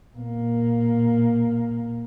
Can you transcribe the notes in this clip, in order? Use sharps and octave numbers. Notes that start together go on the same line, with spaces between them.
A#2 A#3